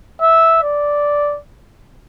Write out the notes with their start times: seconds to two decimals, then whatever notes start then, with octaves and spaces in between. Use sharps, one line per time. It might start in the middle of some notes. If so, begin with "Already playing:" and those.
0.21 E5
0.63 D5